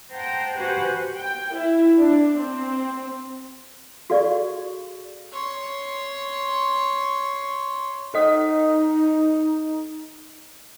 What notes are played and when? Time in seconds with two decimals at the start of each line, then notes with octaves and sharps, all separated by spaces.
0.12 C5 F#5 G5 A5 A#5
0.57 F#4 G4 B4 C5 F#5 G#5
1.16 G5
1.54 E4
1.97 D4
2.38 C4
4.10 F#4 G#4 A4 D5 F5 C#6
5.32 C#5 C6
8.14 D#4 A4 D#5 D#6